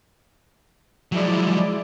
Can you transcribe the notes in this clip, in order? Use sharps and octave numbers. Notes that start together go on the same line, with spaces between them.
F3 F#3 G#3 E4 D5